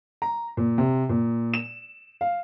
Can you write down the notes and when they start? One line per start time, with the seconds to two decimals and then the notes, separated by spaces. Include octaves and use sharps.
0.22 A#5
0.57 A#2
0.78 C3
1.09 A#2
1.54 E7
2.21 F5